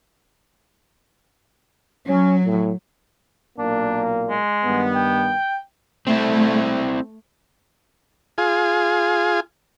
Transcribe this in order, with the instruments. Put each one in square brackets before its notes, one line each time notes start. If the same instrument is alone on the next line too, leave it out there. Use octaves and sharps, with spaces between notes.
[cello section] F#3 [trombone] C#4
[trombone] A2
[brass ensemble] B1 A#2 A#3 [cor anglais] D4
[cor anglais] G#3
[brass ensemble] G2 D#3 B3
[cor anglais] G5
[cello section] A3 [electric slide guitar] C4 E4
[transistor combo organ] F4 G#4